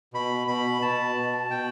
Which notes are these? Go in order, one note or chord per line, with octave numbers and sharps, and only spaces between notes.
B2 B5
B2 B5
B2 A5
B2
B2 G5